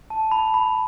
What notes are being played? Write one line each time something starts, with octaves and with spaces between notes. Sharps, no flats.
A5
B5
B5